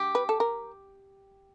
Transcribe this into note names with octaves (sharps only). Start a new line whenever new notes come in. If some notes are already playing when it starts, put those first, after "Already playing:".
Already playing: G4
B4
A4
A#4